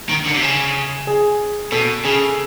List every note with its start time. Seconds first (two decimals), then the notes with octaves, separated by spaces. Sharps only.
0.09 D#3
0.26 D3
0.35 C3
0.42 C#3
1.07 G#4
1.72 B2 A4
2.04 C#3 G#4